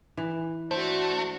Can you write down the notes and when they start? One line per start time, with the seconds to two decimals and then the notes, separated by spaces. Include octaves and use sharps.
0.17 E3
0.71 A3 D4 F#4 C5